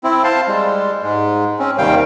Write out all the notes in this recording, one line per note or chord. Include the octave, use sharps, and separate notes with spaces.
C4 E4
C5 F5 A5 C6
G3 G#3
G#2 G#3
C4 C#4
D#2 C3 D#3 G3 F5 G5